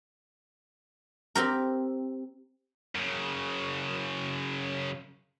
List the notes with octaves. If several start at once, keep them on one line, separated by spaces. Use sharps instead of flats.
C4 G4 A#4
F#2 C#3